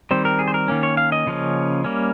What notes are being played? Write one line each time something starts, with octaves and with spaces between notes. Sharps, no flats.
D#3 G3 C4 C5
A#4
G#4
C5
A#4
D#3 A#3 C#4
C#5
F5
D#5
C#3 F3 A#3 C#4
G3 A#3 C#4